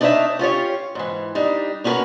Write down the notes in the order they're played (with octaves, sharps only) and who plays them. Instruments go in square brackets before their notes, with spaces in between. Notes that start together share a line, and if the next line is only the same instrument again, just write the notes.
[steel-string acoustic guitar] D4 D#4 F#4 B4 C#5 E5
C#4 F4 G4 C#5
G#2 E3
G3 D4 D#4
A#3 C#4 F#4 G4 A#4 B4